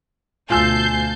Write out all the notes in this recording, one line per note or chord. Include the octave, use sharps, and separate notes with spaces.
D2 B2 F4 G#5 A5 E6 G6 C7